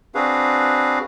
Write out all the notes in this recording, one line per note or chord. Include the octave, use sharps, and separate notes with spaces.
C4 D4 F#4 G#4 B4 F5